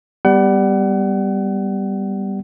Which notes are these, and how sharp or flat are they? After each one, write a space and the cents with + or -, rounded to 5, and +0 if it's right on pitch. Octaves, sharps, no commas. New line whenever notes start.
G3 +0 B3 +0 F#5 +35